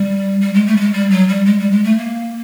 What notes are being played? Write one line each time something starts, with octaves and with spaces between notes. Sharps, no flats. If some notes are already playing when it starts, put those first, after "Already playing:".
Already playing: G3
G3
G#3
A3
G3
G#3
G3
F#3
G3
G#3
G3
G#3
A3
A#3